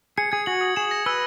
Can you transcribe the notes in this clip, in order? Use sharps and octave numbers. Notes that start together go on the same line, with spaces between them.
G#4 C#7
G#4 G#6
F#4 F#7
D#6
G#4 E7
A#6
B4 E6